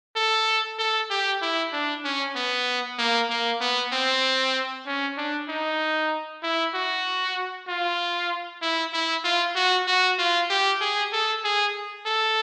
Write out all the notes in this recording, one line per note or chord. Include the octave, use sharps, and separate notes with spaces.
A4
A4
G4
E4
D4
C#4
B3
A#3
A#3
B3
C4
C#4
D4
D#4
E4
F#4
F4
E4
E4
F4
F#4
F#4
F4
G4
G#4
A4
G#4
A4